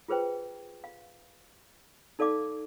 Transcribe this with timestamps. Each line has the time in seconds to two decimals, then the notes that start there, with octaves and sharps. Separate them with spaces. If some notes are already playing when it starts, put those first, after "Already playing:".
0.08 F4 G#4 B4 C5 G5
0.84 F5
2.19 D#4 A4 D5 F5 D6